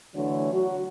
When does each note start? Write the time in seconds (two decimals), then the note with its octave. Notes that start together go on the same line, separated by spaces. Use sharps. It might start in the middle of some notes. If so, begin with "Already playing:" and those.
0.15 D3 E3 F#3 A3 C#5
0.53 F#3 F#4